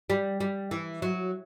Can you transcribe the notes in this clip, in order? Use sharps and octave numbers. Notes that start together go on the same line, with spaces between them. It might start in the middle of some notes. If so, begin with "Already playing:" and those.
G3
G3
E3
F#3